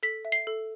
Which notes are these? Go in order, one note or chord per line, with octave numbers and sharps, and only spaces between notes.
A4 B6
E5
C7
A4